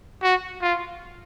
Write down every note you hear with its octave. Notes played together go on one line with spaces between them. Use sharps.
F#4
F4